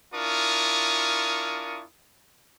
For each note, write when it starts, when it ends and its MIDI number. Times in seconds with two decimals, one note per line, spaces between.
0.14 1.83 62
0.14 1.83 64
0.14 1.83 65
0.14 1.83 70
0.14 1.83 85
0.14 1.83 87